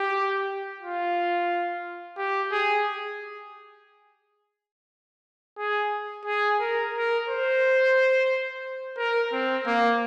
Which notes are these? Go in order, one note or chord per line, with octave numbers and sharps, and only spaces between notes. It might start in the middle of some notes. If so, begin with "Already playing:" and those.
Already playing: G4
F4
G4
G#4
G#4
G#4
A#4
A#4
C5
A#4
C4
A#3